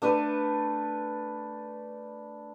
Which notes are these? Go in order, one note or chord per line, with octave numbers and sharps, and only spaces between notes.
A3 D4 B4